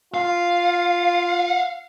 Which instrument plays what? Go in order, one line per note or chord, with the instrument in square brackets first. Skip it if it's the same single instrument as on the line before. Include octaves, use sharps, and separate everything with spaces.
[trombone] F4 [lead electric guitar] F5